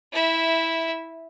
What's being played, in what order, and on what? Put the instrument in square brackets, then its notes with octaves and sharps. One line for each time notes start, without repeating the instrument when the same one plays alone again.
[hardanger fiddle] E4 E5